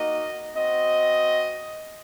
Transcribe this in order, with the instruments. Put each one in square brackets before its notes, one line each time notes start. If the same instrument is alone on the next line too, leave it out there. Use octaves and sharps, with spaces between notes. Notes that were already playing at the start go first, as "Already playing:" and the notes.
Already playing: [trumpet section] A#3 D#4 F#4 D#5
C4 F#4 D#5